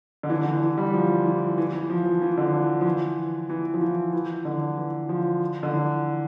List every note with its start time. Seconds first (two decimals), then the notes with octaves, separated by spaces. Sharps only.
0.23 D3
0.30 E3
0.41 D3
0.46 E3
0.62 E3
0.78 G3
0.93 F3
1.26 E3
1.58 E3
1.73 E3
1.90 F3
2.05 F3
2.22 E3
2.37 D3
2.54 E3
2.81 F3
2.85 E3
3.49 E3
3.74 F3
3.81 E3
4.13 E3
4.45 D3
4.77 E3
5.09 F3
5.63 D3
5.73 E3